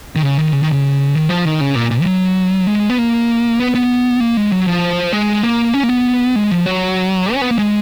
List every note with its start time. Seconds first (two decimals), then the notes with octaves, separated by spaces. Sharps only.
0.16 D#3
0.23 C#3
0.38 D#3
0.52 C#3
0.63 D#3
0.72 C#3
1.15 D#3
1.29 F3
1.45 D#3
1.61 C#3
1.75 A#2
1.91 A#2
2.01 F3
2.06 F#3
2.67 G#3
2.90 B3
2.98 A#3
3.59 B3
3.75 B3
4.20 A#3
4.37 G#3
4.51 F#3
4.66 F3
5.13 G#3
5.43 A#3
5.74 C#4
5.83 A#3
5.89 B3
6.36 G#3
6.51 F3
6.66 F#3
7.34 C#4
7.42 B3
7.51 A#3
7.59 G#3